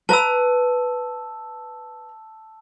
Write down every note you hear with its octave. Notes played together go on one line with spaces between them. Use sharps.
B4 A5 A#5 E6